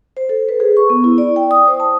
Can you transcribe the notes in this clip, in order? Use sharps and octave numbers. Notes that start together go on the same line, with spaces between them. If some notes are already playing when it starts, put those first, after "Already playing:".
C5
A4
B4
G#4
C#6
B3
E4
D5
G5
D#6
C5
A5